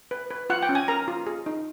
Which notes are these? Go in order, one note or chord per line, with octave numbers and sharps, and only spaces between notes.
B4
B4
F4 F#5
G5
C#4
G#5
A#4 A#5
F4
G#4
D#4